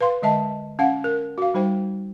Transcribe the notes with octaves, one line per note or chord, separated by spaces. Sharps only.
B4 F5 C6
D3 G#3 D#5 E5 A5
C#4 F5 F#5
A#4
F#4 F5
G3 D#4 C5 G5